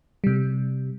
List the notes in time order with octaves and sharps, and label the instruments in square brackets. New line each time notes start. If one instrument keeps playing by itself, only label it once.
[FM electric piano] C3 G3